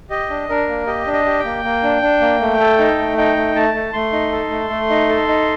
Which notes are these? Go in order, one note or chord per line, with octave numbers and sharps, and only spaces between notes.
G4 D#5
D4
D4 A#4
A#3
G4 D#5
D4
D#5
G4
G5
A#3
A#3
D4
D4
A#3
A3
A4
D#4
A3
D#4 G5
A3
A3 A5
A3
A3 C6
D#4
A4
A3
A3
D#4
A4
D#4